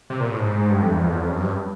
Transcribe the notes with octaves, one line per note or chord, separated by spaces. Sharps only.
C3
A#2
A2
G#2
G2
F2
E2
F2
E2
F2
F#2
G2